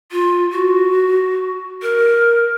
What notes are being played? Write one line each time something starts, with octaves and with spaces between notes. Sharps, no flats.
F4
F#4
A#4